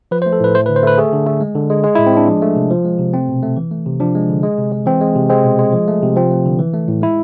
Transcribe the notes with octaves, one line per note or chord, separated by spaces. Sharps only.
F3 B4
C5
A3
A4
A2 B4
A3 C5
B4
D3
C5
A3 B4
A3 G#4
D3
A3
G#3
D3
G#3
G#3
E4
A2
C4
G#3 D4
F3
A3
C3
F3
G#3
C3
A3 C4
B2
A3
E3
A3
C3
F3 D4
G#3
D3
G#3
C3
G#3
E3 C4
G#3
C3
G#3 C4
B2
G#3
F3
A3
C3
F3 C4
A3
D3
E3
A3
A2
G#3 E4